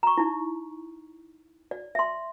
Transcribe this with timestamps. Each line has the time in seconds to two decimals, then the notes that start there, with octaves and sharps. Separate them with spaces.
0.03 A#5 C#6
0.18 D#4 E4
1.71 D5
1.95 E5 C6